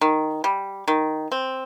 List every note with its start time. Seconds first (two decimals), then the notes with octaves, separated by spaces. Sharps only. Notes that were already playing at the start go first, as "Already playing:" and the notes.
0.01 D#3
0.44 G3
0.88 D#3
1.32 C4